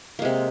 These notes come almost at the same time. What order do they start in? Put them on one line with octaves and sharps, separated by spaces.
A#3 G#3 C3